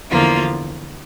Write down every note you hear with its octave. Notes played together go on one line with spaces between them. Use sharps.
E2 D3 F3 A#3 F4